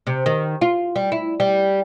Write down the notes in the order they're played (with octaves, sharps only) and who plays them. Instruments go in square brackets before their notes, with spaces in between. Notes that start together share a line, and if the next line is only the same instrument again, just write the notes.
[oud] C3
D#3
F4
G3
E4
G3